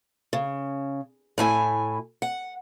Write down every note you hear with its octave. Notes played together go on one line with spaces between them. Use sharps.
C#3
A2 E4 G#5
F#5